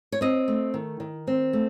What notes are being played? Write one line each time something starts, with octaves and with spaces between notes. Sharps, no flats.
C#5
C4 D#5
A3
D#3
D#3
C4
A3